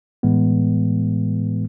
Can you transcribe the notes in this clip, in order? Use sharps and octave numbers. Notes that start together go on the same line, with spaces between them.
A2 E3 G#3 B3